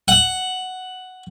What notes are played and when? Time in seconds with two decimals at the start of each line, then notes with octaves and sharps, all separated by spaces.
0.08 F#5